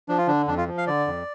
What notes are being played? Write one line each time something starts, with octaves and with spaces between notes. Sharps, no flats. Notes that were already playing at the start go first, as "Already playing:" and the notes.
F3 D4
F4
D3 D4
F2 D4
F4
F3
F5
D3 D5
F2